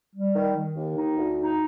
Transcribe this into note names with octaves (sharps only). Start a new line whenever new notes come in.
G3
D#3
D#3
D#2
D#4
D2
D#4